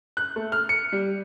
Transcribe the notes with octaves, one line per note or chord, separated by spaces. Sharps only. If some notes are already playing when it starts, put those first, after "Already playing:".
F#6
A3
F6
C#7
G3